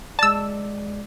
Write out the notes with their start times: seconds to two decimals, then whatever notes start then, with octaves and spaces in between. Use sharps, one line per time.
0.19 G#3 D5 A5 E6